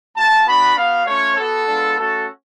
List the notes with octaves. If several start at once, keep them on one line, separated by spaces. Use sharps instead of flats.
A3 F4 A5
B3 D4 F#4 B5
B3 F#4 F5
A3 C#4 F4 C#5
B3 F#4 A4
G#3 B3 D4 F4
A3 C#4 F#4 A4